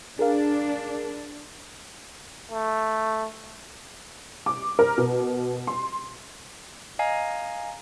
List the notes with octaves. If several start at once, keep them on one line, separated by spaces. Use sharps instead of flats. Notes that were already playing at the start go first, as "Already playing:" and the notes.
D4 G#4 A#4 F5
A3
D6
A#4
B2
C6
D#5 F5 G#5 A#5